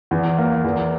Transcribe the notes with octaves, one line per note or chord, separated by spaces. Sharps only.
E2
A#3
E2